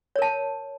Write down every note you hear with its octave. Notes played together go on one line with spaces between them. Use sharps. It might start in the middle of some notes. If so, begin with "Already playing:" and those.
A#4 C#5 A5